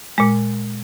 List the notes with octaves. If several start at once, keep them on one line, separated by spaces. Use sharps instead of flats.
A#2 G#3